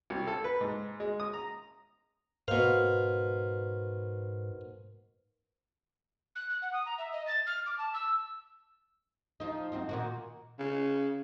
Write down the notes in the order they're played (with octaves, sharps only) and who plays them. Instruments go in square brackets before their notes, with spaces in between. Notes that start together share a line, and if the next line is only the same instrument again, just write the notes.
[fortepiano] C2
A4
B4
G#2
G#3
D#6
A#5
[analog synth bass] G#2 [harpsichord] B2 F5 [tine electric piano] A#4 C5
[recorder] F#6
F#6
F#5
D#6
A#5
E5
D#5
A6
F6
D6
A5
E6
[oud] F3 D#4
F#2 C4 D#4
A#2 D#3 F#4
[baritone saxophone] C#3